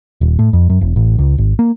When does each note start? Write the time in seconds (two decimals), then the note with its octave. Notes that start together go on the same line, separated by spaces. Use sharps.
0.21 D#1
0.39 A2
0.53 F2
0.69 F#2
0.81 E1
0.96 A1
1.18 C#2
1.38 G#1
1.59 A#3